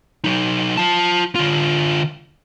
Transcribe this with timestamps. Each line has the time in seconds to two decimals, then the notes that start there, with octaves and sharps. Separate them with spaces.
0.24 F#3 D#4
0.77 F4 A5
1.36 D3 F4